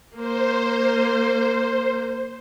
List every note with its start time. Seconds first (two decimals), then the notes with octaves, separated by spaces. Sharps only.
0.16 A#3 C5